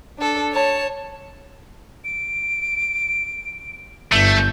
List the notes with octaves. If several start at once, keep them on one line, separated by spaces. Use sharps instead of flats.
D4 A4
C#5 A5
D7
G1 A3 G6